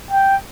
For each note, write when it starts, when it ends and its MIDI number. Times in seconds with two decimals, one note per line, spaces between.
0.11 0.36 79